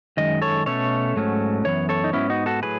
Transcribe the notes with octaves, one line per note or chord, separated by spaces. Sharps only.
F#2 D#3 G#3 D#5
A4 C#5
B2 A3 C#4 A4 C#5
G#2 F#3 A3 C#4
F#2 E3 B3 C#5
A4 C#5
D#4
G#2 F#3 B3 C#4 E4
D#4 F#4
F#4 A4
A2 F#3 G#4 B4